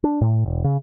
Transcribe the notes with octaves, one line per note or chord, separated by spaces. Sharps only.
D4
A2
E1
C#3